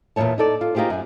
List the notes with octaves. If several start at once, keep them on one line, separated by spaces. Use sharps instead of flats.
E2 A#2 D#3 A3 C#5 A5
D#4 A4 D5
F4
A#3 D#4 F4 G4 G#4 C5
F#2 G#5